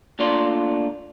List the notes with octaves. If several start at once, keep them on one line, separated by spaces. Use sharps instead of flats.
A#2 A3 D4 F4 D5 C6